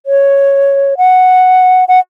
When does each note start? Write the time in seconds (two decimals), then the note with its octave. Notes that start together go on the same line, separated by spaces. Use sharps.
0.06 C#5
0.97 F#5
1.88 F#5